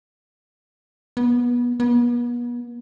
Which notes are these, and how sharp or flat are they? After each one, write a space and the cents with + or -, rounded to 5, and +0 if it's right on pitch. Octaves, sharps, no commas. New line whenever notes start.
B3 -25
B3 -40